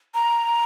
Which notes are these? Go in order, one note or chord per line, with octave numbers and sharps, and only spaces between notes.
A#5